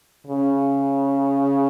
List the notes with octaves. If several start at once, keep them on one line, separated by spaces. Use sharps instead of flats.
C#3